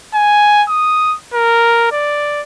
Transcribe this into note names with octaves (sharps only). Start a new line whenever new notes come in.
G#5
D#6
A#4
D5